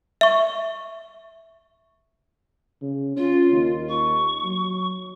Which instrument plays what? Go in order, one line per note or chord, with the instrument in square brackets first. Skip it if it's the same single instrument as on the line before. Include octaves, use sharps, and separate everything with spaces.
[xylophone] E5 C#6
[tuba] C#3
[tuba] C#4 [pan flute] F4
[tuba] D#2
[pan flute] C#6
[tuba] F#3